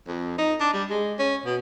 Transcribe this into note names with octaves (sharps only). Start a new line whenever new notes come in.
F2
D#4
D4
G3
G#3
C#4
B2